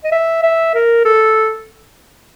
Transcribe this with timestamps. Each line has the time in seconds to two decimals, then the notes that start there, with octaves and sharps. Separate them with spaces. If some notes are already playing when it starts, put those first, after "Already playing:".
0.04 D#5
0.12 E5
0.43 E5
0.74 A#4
1.05 A4